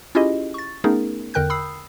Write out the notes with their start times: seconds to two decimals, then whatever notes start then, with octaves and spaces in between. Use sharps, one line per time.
0.15 C#4 E4 F4 G4 G#4 D#5
0.54 C#6 A6
0.84 A3 B3 C#4 D#4 G#4 A#4
1.34 E2 D3 A#4 G5 F#6 G6
1.50 B5 D#6 E6 C7